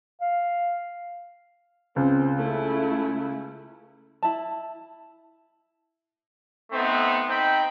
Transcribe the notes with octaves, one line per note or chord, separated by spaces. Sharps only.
F5
C#2 C4
A3 E4
E4 A5
A3 B3 C4 D#4
C4 D#4 G5 B5